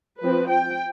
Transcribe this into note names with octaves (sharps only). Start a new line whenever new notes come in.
F3 C4 B4
G5